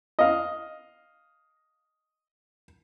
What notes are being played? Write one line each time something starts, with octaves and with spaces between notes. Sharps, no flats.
D#5 F5